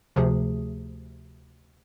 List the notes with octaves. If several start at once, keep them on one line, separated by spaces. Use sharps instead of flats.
D2 C3 F3 G#4